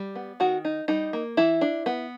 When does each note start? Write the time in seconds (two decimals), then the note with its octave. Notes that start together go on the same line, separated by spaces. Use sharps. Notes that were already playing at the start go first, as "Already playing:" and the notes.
Already playing: G3
0.15 B3
0.40 D#3 F#4
0.65 D#4
0.88 G3 D#4
1.13 A#3
1.37 E3 E4
1.61 D4
1.86 B3